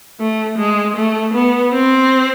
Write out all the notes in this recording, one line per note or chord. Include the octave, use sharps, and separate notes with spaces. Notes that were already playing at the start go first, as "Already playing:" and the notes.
A3
G#3
A3
B3
C4